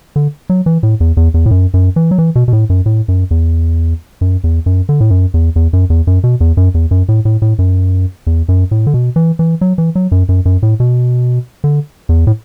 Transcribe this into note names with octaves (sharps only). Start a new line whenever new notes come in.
D3
F#3
E3
A2
E2
E2
E2
A2
F#2
F#2
E3
F#3
E3
B2
B2
A2
F#2
A2
F#2
E2
F#2
E2
F#2
D3
A2
F#2
E2
E2
F#2
E2
F#2
B2
E2
F#2
E2
F#2
A2
A2
A2
F#2
E2
F#2
A2
D3
B2
E3
E3
F#3
E3
F#3
F#2
F#2
F#2
A2
B2
D3
E2
A2